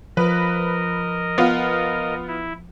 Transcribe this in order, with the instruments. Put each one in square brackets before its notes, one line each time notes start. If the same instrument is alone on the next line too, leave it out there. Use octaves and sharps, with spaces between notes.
[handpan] F3 [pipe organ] A#4 D#5 [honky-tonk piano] B4
[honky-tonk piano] B3 F4
[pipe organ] E4